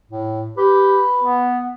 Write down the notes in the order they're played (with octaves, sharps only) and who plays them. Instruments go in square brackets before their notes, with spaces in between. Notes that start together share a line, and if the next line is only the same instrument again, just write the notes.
[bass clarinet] A2
[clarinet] G4 [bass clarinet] B4
[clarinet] B3